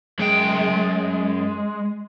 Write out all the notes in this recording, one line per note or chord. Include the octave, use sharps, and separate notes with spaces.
F#2 G#3 G5